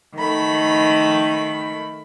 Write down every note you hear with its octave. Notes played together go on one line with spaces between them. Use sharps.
D#3 A3 B5